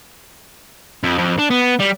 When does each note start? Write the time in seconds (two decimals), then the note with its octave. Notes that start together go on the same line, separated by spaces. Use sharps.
1.03 F2
1.18 F2
1.39 D4
1.50 B3
1.80 G3